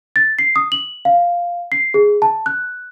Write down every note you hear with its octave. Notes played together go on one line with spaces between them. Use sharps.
A6
C7
D#6
F#7
F5
C7
G#4
A5
F#6